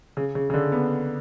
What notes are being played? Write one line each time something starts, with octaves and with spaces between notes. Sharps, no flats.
C#3
C#3
C#3
D3
B3